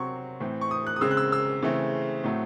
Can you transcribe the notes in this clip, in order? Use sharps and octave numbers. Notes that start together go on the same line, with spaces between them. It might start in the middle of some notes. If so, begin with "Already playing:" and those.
Already playing: C3 F#3 C4 C6 C#6
A2 E3 C4
C#6
D#6
F#6
D#6
C#3 G#3 C4 E6
F#6
E6
E6
C#3 E3 A3 C4
A2 F#3 A3 C4